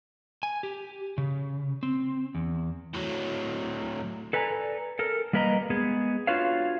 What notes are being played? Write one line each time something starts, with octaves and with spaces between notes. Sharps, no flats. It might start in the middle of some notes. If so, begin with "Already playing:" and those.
G#5
G4
C#3
C4
E2
A2 F#3
A4 B4 D5 G#5 A#5
A4 A#4
G3 A#3 A#4 B4 D#5 A#5
G#3 B3 G#4
D4 F4 F#4 B4 C#5 F5